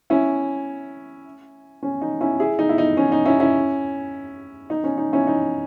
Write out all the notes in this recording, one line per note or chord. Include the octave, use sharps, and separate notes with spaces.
C#4 E4
C#4
D#4
C#4 E4
E4 G#4
D#4
E4
D#4
C#4
D#4
C#4 E4
C#4 E4
D#4
C#4
D#4
C#4 E4
D#4